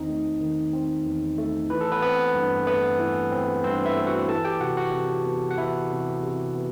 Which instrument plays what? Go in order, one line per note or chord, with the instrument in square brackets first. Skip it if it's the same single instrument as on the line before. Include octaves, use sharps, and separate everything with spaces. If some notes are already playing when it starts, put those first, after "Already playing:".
Already playing: [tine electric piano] E2 D#3 C4 D#4 D#5
A3
D#3
C4
E2
A3
E3 B4
A4
B3 B4
B3 C4 B4
G2
A3 B3 B4
E3
C4
G2 C4 C5
E4 E5
A3
F#4 F#5
E3 A4 A5
G4 G5
C3 F#4 F#5
F#4 F#5
C3
B3
F#5
E3 E4 E5
C3
C3
B3